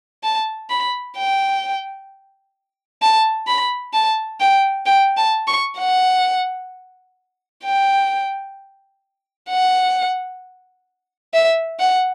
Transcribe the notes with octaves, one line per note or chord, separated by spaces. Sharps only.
A5
B5
G5
A5
B5
A5
G5
G5
A5
C#6
F#5
G5
F#5
E5
F#5